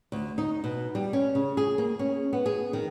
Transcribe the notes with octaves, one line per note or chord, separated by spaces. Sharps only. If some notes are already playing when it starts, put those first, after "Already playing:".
D2
D#4
B2
G3
C#4
C#3
G#4
A#3
C#4
B3
G#4
D#3